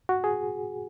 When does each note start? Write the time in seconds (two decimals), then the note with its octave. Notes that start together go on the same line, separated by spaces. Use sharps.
0.09 F#4
0.24 G#4